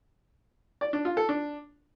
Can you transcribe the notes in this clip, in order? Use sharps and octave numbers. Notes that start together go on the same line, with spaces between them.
D5
D4
F4
A4
D4